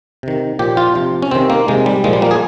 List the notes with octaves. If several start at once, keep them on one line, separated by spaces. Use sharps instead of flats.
C3 D#3
A#2 F3 G4
F4
C3 F3
C#4
C3 D#3 C4
A#3
C3 D#3 G#3
G3
A#2 F3 G#3
G3
A#3
G#4